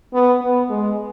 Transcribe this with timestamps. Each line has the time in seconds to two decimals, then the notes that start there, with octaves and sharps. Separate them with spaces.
0.14 B3
0.42 B3
0.70 G#3